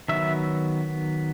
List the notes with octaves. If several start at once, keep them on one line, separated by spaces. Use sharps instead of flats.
D#3 F#3 B3 E5